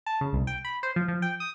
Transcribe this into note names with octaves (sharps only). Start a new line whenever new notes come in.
A5
C#3
C2
G5
B5
C5
F3
F3
G5
D#6